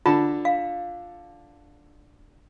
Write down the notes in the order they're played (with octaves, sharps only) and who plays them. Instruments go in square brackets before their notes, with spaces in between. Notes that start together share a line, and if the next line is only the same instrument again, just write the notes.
[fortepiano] D3 A5 [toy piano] F4
[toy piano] F5